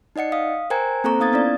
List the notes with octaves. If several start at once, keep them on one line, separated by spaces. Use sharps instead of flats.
D#4 D5 D#5 F#5 C#7
F5 D#6
A#4 C5 G5 G#5 A#5 G#6
A#3 C4 A4 C5 A#5 C#6
B3 D#4 F5 D#6 G#6 A6
B3 C#4 E4 D5